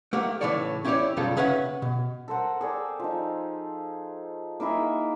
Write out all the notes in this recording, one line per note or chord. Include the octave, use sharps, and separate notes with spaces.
A3 A#3 G4 F#5
A2 C#3 E3 A4 C#5 D5
C#4 E4 G4 A4 C#5 D5
B1 F#2 C#3 G3 F4 A4
C#3 C#4 B4 E5 F#5
B2
A4 A#4 C5 F#5
G#4 A4 D5 G5
F3 D#4
A#3 D#4 E4 G#4